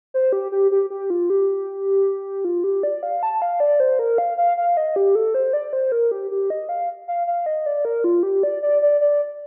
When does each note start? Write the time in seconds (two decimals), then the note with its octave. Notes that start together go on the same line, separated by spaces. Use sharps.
0.14 C5
0.33 G4
0.52 G4
0.71 G4
0.90 G4
1.10 F4
1.30 G4
2.45 F4
2.64 G4
2.83 D5
3.03 F5
3.23 A5
3.42 F5
3.60 D5
3.80 C5
3.99 A#4
4.18 F5
4.38 F5
4.57 F5
4.77 D#5
4.96 G4
5.15 A4
5.34 C5
5.53 D5
5.73 C5
5.92 A#4
6.11 G4
6.31 G4
6.50 D#5
6.69 F5
7.08 F5
7.27 F5
7.46 D#5
7.66 D5
7.85 A#4
8.04 F4
8.23 G4
8.43 D5
8.63 D5
8.82 D5
9.01 D5